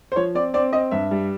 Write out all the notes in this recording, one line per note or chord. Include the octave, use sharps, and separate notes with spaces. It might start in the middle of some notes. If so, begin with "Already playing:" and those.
C5
F3 C#5
C4 D5
C4 D5
C4 D#5
G2 E5
G3